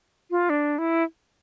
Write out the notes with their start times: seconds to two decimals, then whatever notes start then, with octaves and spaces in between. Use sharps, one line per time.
0.30 F4
0.50 D4
0.78 E4